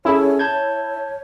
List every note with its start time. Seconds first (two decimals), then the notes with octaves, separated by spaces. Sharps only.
0.05 C#4 E4 G#4 A4 C#5
0.39 A5 G6 G#6